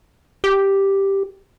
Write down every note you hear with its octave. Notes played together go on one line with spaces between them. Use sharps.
G4